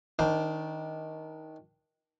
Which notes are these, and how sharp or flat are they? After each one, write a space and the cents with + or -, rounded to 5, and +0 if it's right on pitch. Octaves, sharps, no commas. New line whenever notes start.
D#3 +15 D4 -5 C5 -15